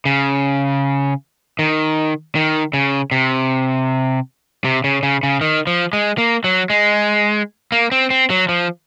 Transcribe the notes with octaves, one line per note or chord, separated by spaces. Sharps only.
C#3
D#3
D#3
C#3
C3
C3
C#3
C#3
C#3
D#3
F3
G#3
A#3
F#3
G#3
A#3
C4
C4
F#3
F3